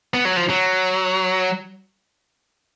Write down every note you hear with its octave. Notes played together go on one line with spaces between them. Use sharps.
B3
F#3
F3
F#3